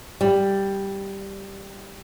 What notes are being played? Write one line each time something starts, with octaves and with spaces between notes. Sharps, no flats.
G3